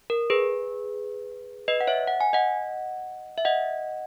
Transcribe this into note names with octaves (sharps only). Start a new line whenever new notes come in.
A#4
G#4 B4
B4 D#5
F#5
C#5 E5
F#5
G#5
D#5 F#5
E5
D#5 F#5